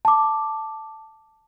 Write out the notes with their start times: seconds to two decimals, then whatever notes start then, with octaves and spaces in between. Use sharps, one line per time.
0.05 A5 D6